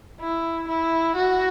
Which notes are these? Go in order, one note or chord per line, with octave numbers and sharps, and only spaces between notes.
E4
E4
F#4